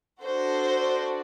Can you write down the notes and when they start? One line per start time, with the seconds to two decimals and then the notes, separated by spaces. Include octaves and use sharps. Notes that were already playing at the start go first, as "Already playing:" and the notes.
0.22 D4 F#4 A4 C5